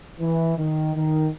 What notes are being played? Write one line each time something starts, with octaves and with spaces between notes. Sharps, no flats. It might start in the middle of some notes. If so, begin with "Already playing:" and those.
E3
D#3
D#3